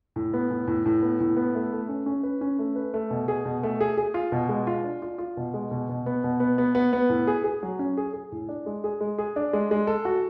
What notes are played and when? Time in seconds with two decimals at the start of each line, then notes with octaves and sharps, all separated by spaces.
0.16 A2
0.33 B3
0.50 A2
0.67 A2
0.86 A2
1.02 B3
1.20 A2
1.37 B3
1.55 A3
1.72 A3
1.89 C#4
2.06 C#4
2.23 B4
2.41 C#4
2.59 A3
2.76 B4
2.94 A3
3.10 B2
3.28 G#4
3.45 B2
3.63 A3
3.81 G#4
3.97 G#4
4.14 F4
4.32 B2
4.49 G#3
4.67 F4
4.84 D4
5.02 F4
5.18 F4
5.37 B2
5.54 G#3
5.71 B2
5.89 B2
6.06 B3
6.24 B2
6.40 B3
6.58 B3
6.75 B3
6.93 B3
7.09 A2
7.27 G#4
7.44 G#4
7.63 F#3
7.79 C#4
7.97 G#4
8.14 G#4
8.32 A2
8.49 D4
8.66 G#3
8.84 G#4
9.01 G#3
9.18 G#4
9.36 D4
9.53 G#3
9.71 G#3
9.87 A4
10.05 F#4